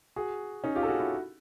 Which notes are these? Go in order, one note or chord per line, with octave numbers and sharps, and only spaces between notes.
F#4 G#4
C#4 D#4
F4 G4
A4
F#4 G#4
E4 F#4